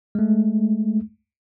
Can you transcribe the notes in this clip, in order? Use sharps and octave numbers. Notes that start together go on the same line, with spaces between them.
G#3 A3